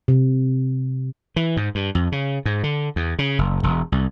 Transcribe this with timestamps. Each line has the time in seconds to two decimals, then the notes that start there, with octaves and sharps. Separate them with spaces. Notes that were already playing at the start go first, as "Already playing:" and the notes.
0.08 C3
1.36 E3
1.57 G#2
1.75 G2
1.95 F2
2.12 C#3
2.45 G#2
2.63 D3
2.96 E2
3.19 C#3
3.38 F#1
3.63 E1
3.92 C2